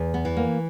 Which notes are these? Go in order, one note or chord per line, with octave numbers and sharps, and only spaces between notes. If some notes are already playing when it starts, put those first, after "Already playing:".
Already playing: E2
B3
E3
A#3